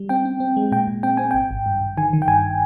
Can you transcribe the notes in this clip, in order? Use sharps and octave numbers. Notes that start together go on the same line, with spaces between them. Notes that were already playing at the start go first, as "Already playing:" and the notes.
Already playing: G3
C4 G5
C4
C4
G#3
A#2 G5
A#2
C4 G5
C4 G#5
G#1 G5
G#1
G2
G#1
D#3 G#5
D#3
G5
G2 G#5